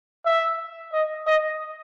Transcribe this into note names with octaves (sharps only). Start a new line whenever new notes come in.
E5
D#5
D#5